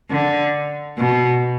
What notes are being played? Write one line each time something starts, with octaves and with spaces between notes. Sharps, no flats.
D3
B2